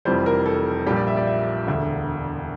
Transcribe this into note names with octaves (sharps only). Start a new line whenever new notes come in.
F1 F2 E3 G3 C5
A#4
A4
A#1 A#2 G3 G4
D5
E5
D5
E5
E1 D2 D3 E5